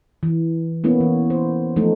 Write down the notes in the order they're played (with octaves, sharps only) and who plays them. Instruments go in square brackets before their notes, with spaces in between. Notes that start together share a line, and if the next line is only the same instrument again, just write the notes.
[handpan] E3
A#3 B3 C#4 E4
E3
C5
F3 A3 D#4